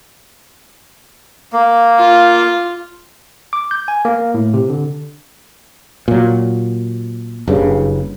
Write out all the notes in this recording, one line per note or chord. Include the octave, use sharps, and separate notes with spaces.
A#3
F4
D6
G6
G#5
A#3
A2
C3
D3
A#2 F#3
F#1 G2 C#3